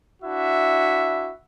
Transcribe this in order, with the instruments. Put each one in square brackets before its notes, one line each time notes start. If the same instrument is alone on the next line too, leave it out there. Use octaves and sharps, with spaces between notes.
[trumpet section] D4 E4 F#4 E5